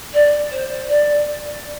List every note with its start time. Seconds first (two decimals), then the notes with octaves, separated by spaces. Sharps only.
0.14 D5
0.51 C5
0.89 D5